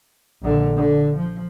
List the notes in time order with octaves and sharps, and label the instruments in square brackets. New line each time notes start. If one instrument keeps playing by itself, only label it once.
[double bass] A#1 D3
D3
F3